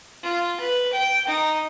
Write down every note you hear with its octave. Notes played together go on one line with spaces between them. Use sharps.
F4
B4
G5
D#4